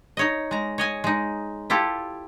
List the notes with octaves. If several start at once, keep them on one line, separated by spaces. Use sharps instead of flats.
D#4 C#5 D#5
G#3 A#5
C#5 D#5 G#5
G#3 D#4
E4 F4 G4 A4